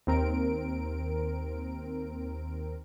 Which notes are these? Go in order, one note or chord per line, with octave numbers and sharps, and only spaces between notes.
D#2 C4 A#4 D7